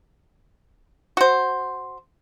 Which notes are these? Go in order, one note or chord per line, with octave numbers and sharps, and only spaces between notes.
F#4 C5